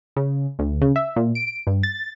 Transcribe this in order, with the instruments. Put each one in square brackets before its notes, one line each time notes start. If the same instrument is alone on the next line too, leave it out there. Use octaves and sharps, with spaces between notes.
[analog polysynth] C#3
D2
C#3
E5
A#2
D7
G2
A6